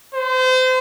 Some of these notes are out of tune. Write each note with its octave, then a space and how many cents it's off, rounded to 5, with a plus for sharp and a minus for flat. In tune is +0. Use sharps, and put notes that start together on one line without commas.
C5 -30